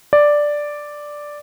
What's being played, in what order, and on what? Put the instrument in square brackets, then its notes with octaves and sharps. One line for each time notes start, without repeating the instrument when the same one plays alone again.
[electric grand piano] D5